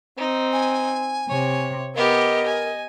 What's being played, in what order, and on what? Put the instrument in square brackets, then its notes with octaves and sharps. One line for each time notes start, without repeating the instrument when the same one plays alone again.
[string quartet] C4 [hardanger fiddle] D#4
[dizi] G#5
[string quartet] C3 [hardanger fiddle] C#5
[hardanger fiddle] B3 G4 [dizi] A#4 [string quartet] D#5
[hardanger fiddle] G#5